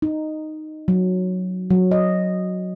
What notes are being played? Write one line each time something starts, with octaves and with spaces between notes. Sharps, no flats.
D#4
F#3
F#3
D#5